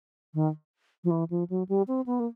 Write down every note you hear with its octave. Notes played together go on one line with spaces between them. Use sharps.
D#3
F3
E3
F3
F#3
G3
C4
B3
A#3